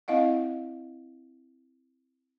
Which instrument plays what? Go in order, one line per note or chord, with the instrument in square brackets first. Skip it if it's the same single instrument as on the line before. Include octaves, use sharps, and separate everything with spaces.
[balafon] C4 E4 D#5 F5 F#5